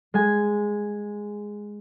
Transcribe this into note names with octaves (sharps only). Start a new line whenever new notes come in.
G#3 G#5 G#6